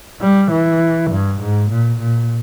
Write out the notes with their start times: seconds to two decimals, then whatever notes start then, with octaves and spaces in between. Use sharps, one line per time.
0.21 G3
0.51 E3
1.11 G2
1.40 G#2
1.70 A#2
1.99 A#2